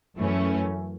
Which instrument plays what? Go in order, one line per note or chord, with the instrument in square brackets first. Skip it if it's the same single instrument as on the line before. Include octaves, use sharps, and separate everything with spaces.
[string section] F#2 E3 A3 C#4